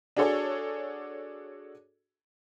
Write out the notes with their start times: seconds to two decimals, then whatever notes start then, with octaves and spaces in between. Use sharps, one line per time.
0.17 D4 F#4 G#4 A4 C#5